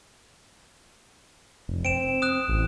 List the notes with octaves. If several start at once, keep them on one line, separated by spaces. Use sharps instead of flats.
F1
C4 D7 E7
D#6 F#6
A1